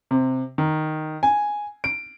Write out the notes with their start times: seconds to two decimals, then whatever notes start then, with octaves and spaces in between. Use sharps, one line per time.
0.11 C3
0.58 D#3
1.23 G#5
1.84 D7